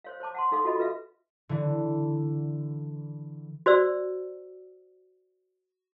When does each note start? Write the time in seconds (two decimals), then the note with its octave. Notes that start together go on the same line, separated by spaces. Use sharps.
0.04 C5 C#5 F5
0.20 C5 C#5 A5 D6
0.34 F#5 A5 C6
0.52 D#4 A4 F5 C6 D6
0.64 F4 F#4 A4 D#5 B5
0.77 F4 F#4 A4 B4 E5 F5
1.49 D3 E3
3.66 F#4 C5 D5 E6